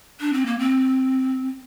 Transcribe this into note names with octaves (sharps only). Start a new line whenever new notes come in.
D4
C4
A#3
C4